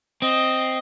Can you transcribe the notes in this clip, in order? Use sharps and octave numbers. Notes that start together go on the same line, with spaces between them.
C4 D#5